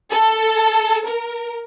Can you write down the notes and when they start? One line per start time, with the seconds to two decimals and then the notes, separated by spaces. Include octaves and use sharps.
0.11 A4
1.06 A#4